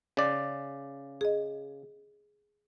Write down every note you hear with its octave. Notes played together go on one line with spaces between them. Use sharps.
C#3 D5
G#4 D#5